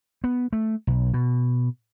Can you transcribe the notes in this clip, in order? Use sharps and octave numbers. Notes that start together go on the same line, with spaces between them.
B3
A3
B1
B2